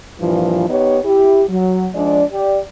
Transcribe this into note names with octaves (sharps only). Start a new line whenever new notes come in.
G2 A#2 E3 F3
B3 D#4 G4 C#5
E4 G4
F#3
F3 G#3 D4 D5
G4 D5